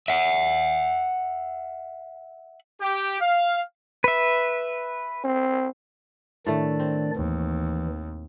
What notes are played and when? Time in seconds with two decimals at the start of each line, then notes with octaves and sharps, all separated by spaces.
0.08 E5 F#5
2.81 G4
3.20 F5
4.04 B4 E5
5.24 C4
6.46 A2 D#3 A3 D4 D5
6.79 C4
7.15 D#2 E3